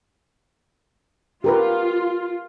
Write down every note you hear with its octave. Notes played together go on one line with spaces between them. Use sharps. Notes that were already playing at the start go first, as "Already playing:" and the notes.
F4 G4 A#4 B4